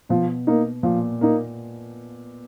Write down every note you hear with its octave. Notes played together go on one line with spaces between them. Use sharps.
B2 F3
A#3 D#4
A#2 F3
A#3 D#4